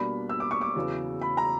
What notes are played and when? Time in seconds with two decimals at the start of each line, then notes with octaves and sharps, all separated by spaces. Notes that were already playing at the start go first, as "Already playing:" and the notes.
Already playing: B2 G3 A#3 D4 B5
0.29 E6
0.40 D6
0.51 C#6
0.61 D6
0.75 E2 C#3 F#3 B3
1.22 B5
1.37 A#5